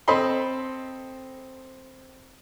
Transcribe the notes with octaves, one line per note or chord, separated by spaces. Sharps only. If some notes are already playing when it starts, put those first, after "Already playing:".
C4 A4 D#5 B5 C6